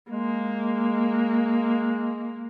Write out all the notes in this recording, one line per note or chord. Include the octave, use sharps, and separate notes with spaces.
G#3 A#3